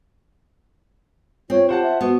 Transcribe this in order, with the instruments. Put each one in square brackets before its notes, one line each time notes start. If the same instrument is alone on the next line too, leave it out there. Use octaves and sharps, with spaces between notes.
[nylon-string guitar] C4 [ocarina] F4 [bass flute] C#5
[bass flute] G4 [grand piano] C5 F#5 A5
[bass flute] E5
[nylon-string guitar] B3 [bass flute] F#4